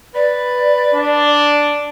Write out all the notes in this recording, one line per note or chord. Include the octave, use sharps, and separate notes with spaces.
B4 D5
D4